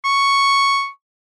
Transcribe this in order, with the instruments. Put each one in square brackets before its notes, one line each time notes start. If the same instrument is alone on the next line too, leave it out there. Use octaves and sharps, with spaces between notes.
[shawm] C#6